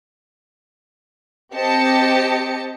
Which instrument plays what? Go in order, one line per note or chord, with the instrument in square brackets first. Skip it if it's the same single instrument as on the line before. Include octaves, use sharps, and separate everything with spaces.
[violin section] C4 G4 D#5 A5 C#7